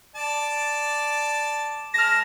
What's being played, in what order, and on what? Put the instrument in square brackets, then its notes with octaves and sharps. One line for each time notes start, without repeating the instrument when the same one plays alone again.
[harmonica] D5 A5
[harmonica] G#3 A5 [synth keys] F6 A#6